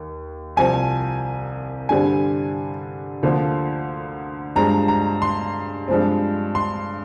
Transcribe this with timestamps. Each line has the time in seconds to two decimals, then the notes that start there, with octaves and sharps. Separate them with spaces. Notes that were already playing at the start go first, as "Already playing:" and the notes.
Already playing: D#2
0.56 C2 C3 F3 C4 G#5
1.89 G2 D3 G3 C4 G#5
3.23 D2 D3 F3 A#3
4.55 G2 F3 G#3 A#5
4.88 A#5
5.22 C6
5.88 G2 F3 G#3 C4
6.55 C6